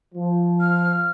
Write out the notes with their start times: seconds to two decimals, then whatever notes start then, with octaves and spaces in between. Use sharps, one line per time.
0.14 F3
0.61 F6